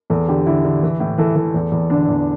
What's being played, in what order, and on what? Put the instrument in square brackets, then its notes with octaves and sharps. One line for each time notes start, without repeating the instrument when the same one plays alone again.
[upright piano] E2 A4
D3 G4
D3 E4
D3
E3
A2
E3 A4
E3
E2
E2
D3 D4
E2